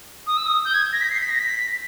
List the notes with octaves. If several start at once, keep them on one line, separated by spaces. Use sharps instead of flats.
D#6
E6
D#6
G6
G#6
A#6
B6
C7
B6
A#6
B6